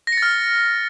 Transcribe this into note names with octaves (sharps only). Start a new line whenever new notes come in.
A#6
C#7
A6
F6